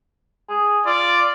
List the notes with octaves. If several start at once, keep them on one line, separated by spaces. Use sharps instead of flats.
G#4
F4 D5